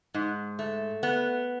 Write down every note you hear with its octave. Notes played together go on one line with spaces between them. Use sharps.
G#2
A3
B3